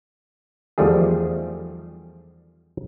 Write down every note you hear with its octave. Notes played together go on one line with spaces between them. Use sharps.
E2 D#3 F3 G3 A3 G#4